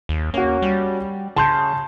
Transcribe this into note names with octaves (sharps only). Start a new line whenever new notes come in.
D#2
A#3 C#4 F#4
G3
C#3 A5 C6 G6